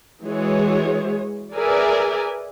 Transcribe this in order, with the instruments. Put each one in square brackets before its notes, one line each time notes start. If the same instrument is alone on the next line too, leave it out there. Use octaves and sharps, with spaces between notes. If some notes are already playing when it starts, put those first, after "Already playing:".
[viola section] E3 G#3 F#4 G#4 C#5
G#4 A#4 B4 D5 E5 G#5